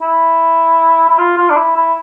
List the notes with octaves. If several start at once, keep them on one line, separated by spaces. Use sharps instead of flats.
E4
E4
F4
F4
D4
E4
E4